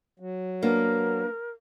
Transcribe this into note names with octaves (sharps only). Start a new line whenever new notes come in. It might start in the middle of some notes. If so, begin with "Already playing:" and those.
F#3
A#3 B3 D4 A#4